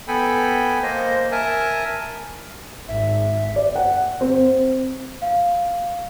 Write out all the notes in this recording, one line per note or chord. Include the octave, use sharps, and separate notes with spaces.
B3 A4 G5 G#5 B5
A#3 C5 D#5
A#4 E5 G#5 A5
G#1 E5
D5
F#5
C4
F5